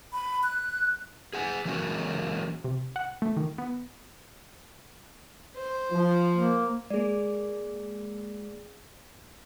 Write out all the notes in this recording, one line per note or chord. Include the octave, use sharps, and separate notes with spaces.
B5
F#6
G#4 F#5 G#5
E3 F#3 G#3 A#3 C#4 F#4
C3
F#5
A3
D#3
B3
C5
F3
A#3
G#3 A#3 G#4 D5